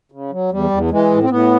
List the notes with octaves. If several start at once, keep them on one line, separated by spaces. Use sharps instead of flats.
C#3
F#3
E2 G3
E2
E3 G#3
A2
C4
A2 B3